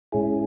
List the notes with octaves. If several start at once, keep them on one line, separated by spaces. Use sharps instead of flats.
A2 G#3 C#4 E4 G#4